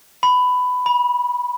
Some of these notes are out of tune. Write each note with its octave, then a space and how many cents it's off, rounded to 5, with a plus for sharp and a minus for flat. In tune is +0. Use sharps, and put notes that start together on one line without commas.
B5 +15
B5 -20